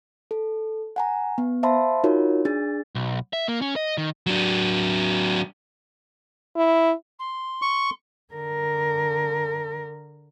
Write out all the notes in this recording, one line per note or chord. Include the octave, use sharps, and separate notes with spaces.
A4
F#5 G#5 A#5
B3
C5 E5 F5 A5 B5 C6
D#4 F4 F#4 A#4 C#5
D4 G#4 A6
B1
E5
A#3
C#4
D#5
D#3
F#3 D4
E4
C6
C#6
D3 A#4